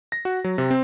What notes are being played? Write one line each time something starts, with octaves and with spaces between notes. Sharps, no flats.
A#6
F#4
F#3
C3
C4